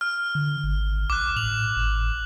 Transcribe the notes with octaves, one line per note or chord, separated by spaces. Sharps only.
F6
D3
G#1
A#1 D6 F#6
A2 F7 F#7
G#1